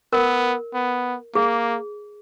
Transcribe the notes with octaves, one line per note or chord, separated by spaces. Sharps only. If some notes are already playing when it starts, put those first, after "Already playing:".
B3 A#4
B3
A#3 G#4